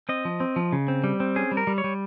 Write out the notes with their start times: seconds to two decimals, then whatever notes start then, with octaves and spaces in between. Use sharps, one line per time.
0.09 C4 D#5
0.25 F3
0.40 C4
0.56 F3
0.72 C#3
0.88 C4
1.04 G3
1.20 C4
1.36 C#4 G#4
1.51 G3
1.57 A#4
1.67 G3
1.78 C#5
1.84 G3